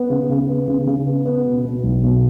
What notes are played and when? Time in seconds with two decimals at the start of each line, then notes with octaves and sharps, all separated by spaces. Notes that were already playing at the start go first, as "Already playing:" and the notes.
Already playing: B3
0.10 C#3
0.30 C#3
0.48 B3
0.68 C#3
0.87 C#3
1.06 B3
1.25 B3
1.46 B2
1.65 B2
1.84 B1
2.04 B2